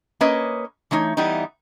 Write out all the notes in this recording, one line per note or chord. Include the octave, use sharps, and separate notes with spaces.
A#3 C#4 B4 C#5 D#5
E3 A3 D#4 C#5
E3 G3 B3 D#4